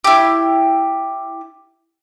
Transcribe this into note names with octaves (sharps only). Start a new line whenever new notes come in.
E4 G4